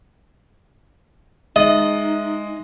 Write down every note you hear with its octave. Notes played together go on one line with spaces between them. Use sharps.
G#3 D#4 D#5 E5